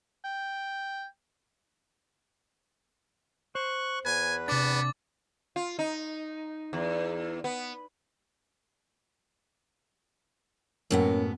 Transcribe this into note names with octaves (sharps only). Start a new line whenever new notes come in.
G5
C5 C#6 F#6
E2 B4 G#5
C3 B3 D4 D6 A6
F4
D#4
E2
B3
F#2 A2 A#3 B3 C#4